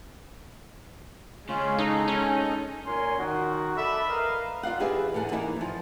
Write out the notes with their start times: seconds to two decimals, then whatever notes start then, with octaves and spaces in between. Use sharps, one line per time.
1.49 C#3 G#3 C#4 F4
1.78 D#4 A4
2.08 C#4 D#4
2.87 A#2 C#4 A#4 G#5 C6
3.19 D#3 F#4
3.76 A4 D5 E5 B5
4.08 A#4 B4 D#5 F5
4.63 F4 D5 F5 F#5
4.80 E2 G4 G#4 B4 D5 E5
5.14 E2 D3 A4 F#5 G#5
5.32 E3 A#3 D#4 E4
5.56 E2 F3